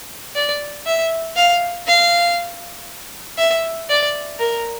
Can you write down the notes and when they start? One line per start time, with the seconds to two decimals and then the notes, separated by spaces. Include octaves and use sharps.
0.36 D5
0.86 E5
1.36 F5
1.87 F5
3.38 E5
3.89 D5
4.39 A#4